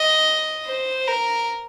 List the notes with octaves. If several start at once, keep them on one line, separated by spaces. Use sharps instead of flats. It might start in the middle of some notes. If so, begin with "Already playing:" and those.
Already playing: D#5
C5
A#4